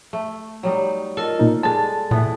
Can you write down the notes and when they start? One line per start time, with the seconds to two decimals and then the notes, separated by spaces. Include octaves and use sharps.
0.13 A3
0.63 F#3 G3 D#4
1.17 F4 A4 A#4 D#5
1.39 A#2 D#4
1.63 G3 G#3 A4 A5 A6
2.11 A#2 E3 B3